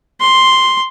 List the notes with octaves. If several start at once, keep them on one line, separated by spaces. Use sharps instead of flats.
C6